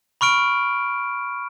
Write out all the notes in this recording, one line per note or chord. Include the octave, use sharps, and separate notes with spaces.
B5 C#6 F6 D7